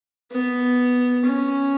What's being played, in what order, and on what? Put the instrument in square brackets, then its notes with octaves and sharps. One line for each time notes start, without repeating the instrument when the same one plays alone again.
[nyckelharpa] B3
C#4